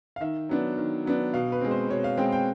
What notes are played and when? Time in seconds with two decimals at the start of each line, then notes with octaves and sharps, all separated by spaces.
0.16 F5
0.21 D#3 E5
0.49 F#3 B3 D4
0.77 D#3
1.05 F#3 B3 D4
1.34 B2 F5
1.52 B4
1.61 G#3 C4
1.71 C5
1.90 B2 C#5
2.04 F5
2.17 G#3 C4 G5
2.32 G5